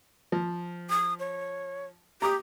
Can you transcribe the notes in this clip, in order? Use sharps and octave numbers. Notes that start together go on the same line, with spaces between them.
F3
D#6
C#5
G4 A#5 D6 D#6